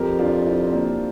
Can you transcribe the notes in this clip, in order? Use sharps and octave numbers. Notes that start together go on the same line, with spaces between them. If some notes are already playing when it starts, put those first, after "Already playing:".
Already playing: F2 G4 A#4
D4 F4
C4 E4
C4
A#3 D4